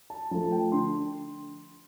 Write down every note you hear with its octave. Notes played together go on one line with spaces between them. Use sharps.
A5
F3 A3 A5
G5
D3 C6